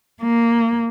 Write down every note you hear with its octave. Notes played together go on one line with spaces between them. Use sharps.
A#3